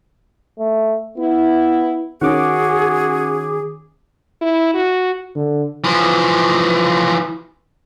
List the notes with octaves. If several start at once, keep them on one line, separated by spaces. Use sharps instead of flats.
A3
B3 E4
D#3 C#4 F#4 G#4 D6
E4
F#4
D3
E3 F3